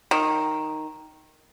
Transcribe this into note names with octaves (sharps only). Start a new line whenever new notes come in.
D#3